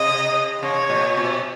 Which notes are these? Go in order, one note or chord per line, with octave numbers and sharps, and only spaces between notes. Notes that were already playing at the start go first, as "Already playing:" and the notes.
Already playing: C3 D#5
C3 C#5
A#2
B2